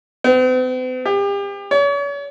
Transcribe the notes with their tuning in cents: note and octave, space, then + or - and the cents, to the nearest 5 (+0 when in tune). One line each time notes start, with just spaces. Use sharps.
C4 -45
G4 +35
C#5 +40